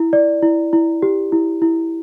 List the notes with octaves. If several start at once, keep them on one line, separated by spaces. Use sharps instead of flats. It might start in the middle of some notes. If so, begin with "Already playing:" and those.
Already playing: E4
D5
E4
E4
G4
E4
E4